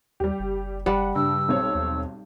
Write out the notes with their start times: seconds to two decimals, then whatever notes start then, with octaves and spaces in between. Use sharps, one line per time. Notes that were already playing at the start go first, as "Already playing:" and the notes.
0.20 D#2 G3 G4
0.39 F#1
0.86 F#1 G3 F#5
1.16 G2 C#3 E6
1.48 B1 C4 C#5
1.75 D#2